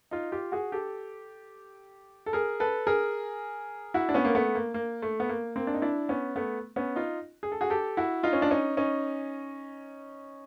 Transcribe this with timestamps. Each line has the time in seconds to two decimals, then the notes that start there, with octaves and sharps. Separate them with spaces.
0.11 D#4 F4
0.32 F4 G4
0.52 F#4 G#4
0.72 G4 A4
2.26 A4
2.33 G#4 A#4
2.60 A4 B4
2.87 G#4 A#4
3.94 E4 F#4
4.09 D4
4.14 B3 C#4
4.25 A#3
4.35 A3 B3
4.55 A#3
4.74 A#3
5.02 A3
5.20 B3
5.29 A#3
5.56 A#3 C4
5.67 D4
5.74 D#4
5.82 D4 E4
6.09 B3 C#4
6.36 A3 B3
6.76 B3 C#4
6.96 D#4 F4
7.43 G#4
7.52 A4
7.61 F#4 G#4
7.70 G4 A4
7.97 E4 F#4
8.23 D#4 F4
8.33 C#4
8.42 D4
8.51 C#4 D#4
8.77 C#4 D#4